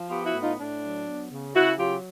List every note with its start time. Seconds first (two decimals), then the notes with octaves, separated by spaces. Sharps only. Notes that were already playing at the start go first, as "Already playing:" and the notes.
Already playing: F3
0.09 B3 F4 G4
0.25 E4 F#4
0.34 A2
0.42 D#4 F4
0.58 A2 D4
0.82 F#3
1.07 B3
1.31 C#3
1.55 C#3 E4 F#4
1.80 F#3 F4 G4